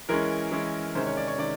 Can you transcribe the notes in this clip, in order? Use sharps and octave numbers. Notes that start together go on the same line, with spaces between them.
E3 G#3 C#4 A#4
E3 G#3 C#4
C3 D#3 G#3 C#4 C5
C#5
D5
C#5
C3 D#3 G#3 C#4 D5